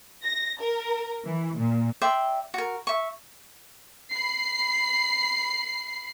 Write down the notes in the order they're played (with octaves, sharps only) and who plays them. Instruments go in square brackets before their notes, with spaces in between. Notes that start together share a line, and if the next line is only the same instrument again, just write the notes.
[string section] A#6
A#4
E3
A#2
[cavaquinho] D5 E5 G5 C6
F#4 A#4
E5 C#6
[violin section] B5 C7